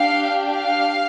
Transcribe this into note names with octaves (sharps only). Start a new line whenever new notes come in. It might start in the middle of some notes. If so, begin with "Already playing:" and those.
Already playing: D4 G4 F5
F5